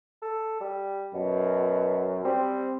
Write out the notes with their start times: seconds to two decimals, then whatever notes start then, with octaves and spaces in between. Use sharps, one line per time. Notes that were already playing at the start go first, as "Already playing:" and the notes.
0.22 A4
0.60 G3
1.14 F#2 B2
2.25 G3 C4